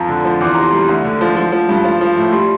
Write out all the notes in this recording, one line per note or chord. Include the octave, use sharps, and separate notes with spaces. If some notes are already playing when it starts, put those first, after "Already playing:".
Already playing: F2 F3 A#5
D3
F3
E2 D6
C6
C3 A#5
C6
G3
D2
D3
F3
F3
F3
G2
F3
F3
A2
G3 C6